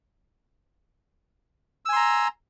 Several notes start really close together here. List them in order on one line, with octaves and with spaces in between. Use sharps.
E6 G#5 C6 A#5